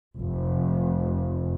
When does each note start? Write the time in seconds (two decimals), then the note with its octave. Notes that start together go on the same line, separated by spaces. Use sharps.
0.18 F1